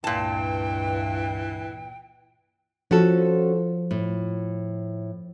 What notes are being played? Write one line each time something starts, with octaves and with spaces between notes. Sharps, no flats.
C#2 G2 A#2 E3 G5 A5
F3 C#4 F#4 A4
A2